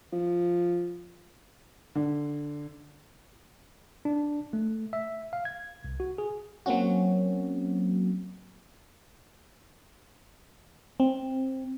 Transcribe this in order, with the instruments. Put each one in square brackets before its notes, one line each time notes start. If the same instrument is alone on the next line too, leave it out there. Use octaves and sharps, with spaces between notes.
[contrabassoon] F3
[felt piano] D3
[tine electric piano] D4
A3
E5
F5
G#6
C2
F#4
G#4
[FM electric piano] F#3 A#3 C4 C#4 F#4
C4